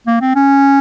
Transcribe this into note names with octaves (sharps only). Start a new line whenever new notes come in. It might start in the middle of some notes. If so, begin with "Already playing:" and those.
A#3
C4
C#4